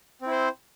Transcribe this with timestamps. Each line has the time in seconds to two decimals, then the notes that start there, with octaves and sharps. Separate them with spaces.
0.21 C4
0.26 E4
0.31 C5